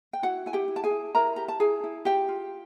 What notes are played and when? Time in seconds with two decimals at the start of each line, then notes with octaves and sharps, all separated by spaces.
0.13 G5
0.23 E4 F#4 F#5
0.46 E4 G#5
0.53 G4 G5
0.68 E4
0.76 A5
0.84 G#4 G#5
0.91 E4
1.15 E4 A#4 A#5
1.36 G4 A#5
1.48 A5
1.60 E4 G#4 G#5
1.84 E4
2.05 F4 G4 G5
2.28 F4